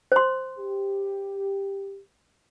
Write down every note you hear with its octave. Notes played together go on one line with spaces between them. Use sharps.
C5 C6
G4